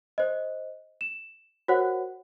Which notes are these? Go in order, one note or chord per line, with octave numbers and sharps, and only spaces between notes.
C5 D#5
E7
F#4 A#4 C5 C#5 F#5